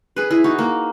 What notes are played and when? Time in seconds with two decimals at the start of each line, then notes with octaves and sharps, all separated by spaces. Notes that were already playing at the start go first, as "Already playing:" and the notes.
0.16 G#4 B4
0.30 E4 G#4
0.44 D#4 F#4
0.59 A#3